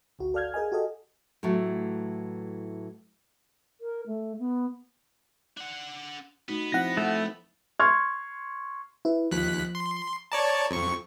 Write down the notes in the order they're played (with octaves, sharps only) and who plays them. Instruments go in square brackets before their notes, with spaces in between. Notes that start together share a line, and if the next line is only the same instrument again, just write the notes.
[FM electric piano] G#1 D2 F#4
A4 D5 F5 F6 G6 G#6
G#4 A#4 D#5 G#5
F#4 G4 A4 D#5
[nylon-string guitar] A2 E3 F#3 A3
[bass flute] A#4
A3
B3
[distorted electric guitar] D4 F#5
[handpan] A3 D#4 F#4 [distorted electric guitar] B3
[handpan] F3 C4 E4 [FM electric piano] F#5 A#6
[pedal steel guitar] A3
[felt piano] C6 C#6 F6 G#6
[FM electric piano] E4 B4
[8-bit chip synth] D#2 F#6 B6 [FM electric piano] F3
[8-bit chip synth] C6
[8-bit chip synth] C#5 D5 A5 [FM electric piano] A#5
[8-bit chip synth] F2 C#6